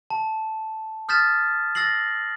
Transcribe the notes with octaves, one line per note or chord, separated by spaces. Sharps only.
A5
D#6 F6 G6 A6 B6 E7
E6 A6 A#6 C7 F#7